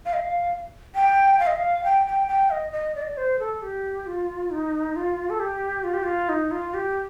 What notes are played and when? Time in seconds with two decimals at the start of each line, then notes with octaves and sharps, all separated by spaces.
0.05 F5
0.13 D#5
0.21 F5
0.95 G5
1.39 F5
1.47 D#5
1.56 F5
1.84 G5
2.06 G5
2.27 G5
2.50 D#5
2.73 D#5
2.95 D5
3.02 D#5
3.10 D5
3.17 C5
3.39 A4
3.62 G4
4.06 F4
4.51 D#4
4.96 F4
5.30 A4
5.40 G4
5.84 F4
5.93 G4
6.03 F4
6.29 D#4
6.51 F4
6.74 G4